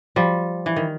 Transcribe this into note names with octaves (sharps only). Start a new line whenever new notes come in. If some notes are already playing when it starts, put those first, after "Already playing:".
F3 G3
E3
D#3